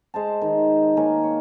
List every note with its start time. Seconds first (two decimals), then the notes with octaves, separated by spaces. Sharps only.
0.14 G#3 C5 A5
0.42 D#3
0.97 A#3 A#4 C#5 G#5
1.23 C#5